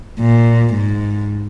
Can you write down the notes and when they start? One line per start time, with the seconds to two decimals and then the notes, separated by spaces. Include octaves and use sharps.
0.20 A#2
0.74 G#2